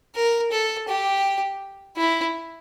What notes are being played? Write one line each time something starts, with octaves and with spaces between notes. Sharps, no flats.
A#4
A4
G4
E4